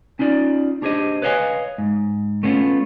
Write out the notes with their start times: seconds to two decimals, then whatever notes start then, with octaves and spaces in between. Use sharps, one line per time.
0.19 C#4 D#4 F4 D5
0.82 D4 G4 G#4 C5 D#5
1.22 B4 C#5 D#5 F5 G#5
1.78 G#2
2.43 A3 B3 C#4 F4